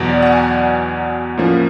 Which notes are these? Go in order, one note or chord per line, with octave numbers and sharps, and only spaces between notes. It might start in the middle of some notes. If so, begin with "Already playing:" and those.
Already playing: E2 B2 F#3 D5
F#5
G#5
G5
A2 F3 A#3 C#4